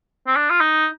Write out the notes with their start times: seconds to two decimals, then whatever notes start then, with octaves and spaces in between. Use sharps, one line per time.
0.27 C4
0.36 D4
0.50 F4
0.61 D#4